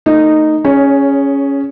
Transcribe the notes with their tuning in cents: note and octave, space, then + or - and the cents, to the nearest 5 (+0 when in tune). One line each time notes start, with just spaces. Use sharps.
A3 +25 D#4 -10
C#4 +0 G#4 +0 C#5 +25